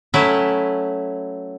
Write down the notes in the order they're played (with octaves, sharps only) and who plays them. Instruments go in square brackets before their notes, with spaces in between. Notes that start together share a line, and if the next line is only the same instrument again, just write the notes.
[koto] F#3 A3 C#4 E4 B4 E5